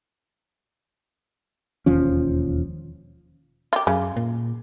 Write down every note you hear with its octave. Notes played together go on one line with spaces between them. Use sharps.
E1 D#2 F3 C#4
F4 G4
F#2 C#3
A#2